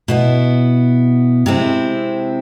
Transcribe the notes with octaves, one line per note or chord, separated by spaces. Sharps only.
B2 B3 E4
C3 G#3 C4 E4